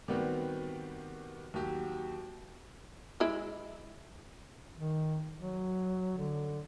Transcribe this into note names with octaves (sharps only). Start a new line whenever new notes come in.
D#3 G3 B3 C4 F#4 G4
D#2 F#3 G4
G#3 E4 E5
D#3
F#3
D3